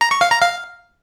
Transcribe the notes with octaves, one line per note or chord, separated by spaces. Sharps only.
A#5
C#6
F5
A#5
F5